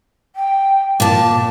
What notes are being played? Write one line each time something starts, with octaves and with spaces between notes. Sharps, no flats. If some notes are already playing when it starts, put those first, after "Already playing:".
G5
A#2 A5 D6